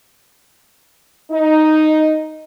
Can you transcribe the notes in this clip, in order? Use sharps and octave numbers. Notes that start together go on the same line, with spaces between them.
D#4